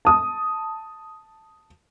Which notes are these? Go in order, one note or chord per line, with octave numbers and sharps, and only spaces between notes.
A5 D#6